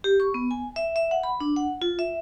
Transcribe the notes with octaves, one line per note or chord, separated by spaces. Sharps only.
G4
C#6
B3
G#5
E5
E5
F#5
B5
D4
F#5
F4
E5